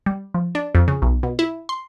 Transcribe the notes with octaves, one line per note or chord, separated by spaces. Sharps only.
G3
F3
D4
F2
C#3
B1
B2
E4
C6